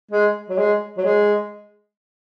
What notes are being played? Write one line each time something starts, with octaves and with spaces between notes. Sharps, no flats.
G#3
F#3
G#3
F#3
G#3